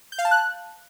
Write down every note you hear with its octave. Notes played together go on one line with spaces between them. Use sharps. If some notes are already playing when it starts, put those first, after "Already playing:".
G6
F5
A5
F#6